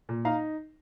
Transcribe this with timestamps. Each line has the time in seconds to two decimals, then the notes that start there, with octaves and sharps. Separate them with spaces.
0.09 A#2
0.25 D#4 F5 A#5